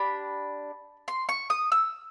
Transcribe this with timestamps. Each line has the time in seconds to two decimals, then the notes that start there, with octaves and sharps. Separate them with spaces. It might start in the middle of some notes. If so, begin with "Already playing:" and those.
Already playing: D4 G4 B5
1.08 C6
1.29 C#6
1.50 D#6
1.72 E6